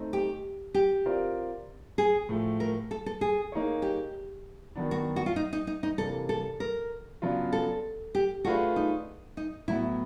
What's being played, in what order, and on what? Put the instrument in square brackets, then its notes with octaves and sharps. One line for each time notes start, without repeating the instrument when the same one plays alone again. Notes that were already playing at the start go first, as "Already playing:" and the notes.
Already playing: [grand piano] A3 C4 D#4
[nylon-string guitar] G4
G4
[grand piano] C4 F4 A#4 D5
[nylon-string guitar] G#4
[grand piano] A2 F3 A3
[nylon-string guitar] A#4
A4
A4
G#4
[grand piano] A#3 D#4 G#4 C#5
[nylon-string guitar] G4
[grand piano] D#3 F#3 B3 D4
[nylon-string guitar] F#4
F#4
F4
D#4
D#4
D#4
D#4
[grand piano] C3 E3 G3 A#3 D4 [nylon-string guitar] A4
[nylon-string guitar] A4
A#4
[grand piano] C#3 F#3 B3 D4 F4
[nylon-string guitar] A4
G4
[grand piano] A3 D4 F4 G#4 B4 [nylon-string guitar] F#4
[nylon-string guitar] D#4
D#4
[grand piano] A2 F#3 B3 [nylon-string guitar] E4